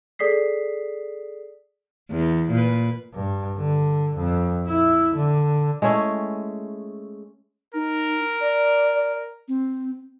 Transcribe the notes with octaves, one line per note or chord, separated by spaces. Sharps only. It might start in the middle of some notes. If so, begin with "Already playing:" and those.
G#4 A4 D5 D#6 B6 C7
E2
A#2 B4
G2
D3
F2
E4
D3
G#3 A3 C#4 E4
D#4 A#4
D5
C4